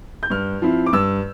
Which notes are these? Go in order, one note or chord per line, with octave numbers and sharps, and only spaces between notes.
G6
G2 F6
F3 C4 E4
D6
G2 E6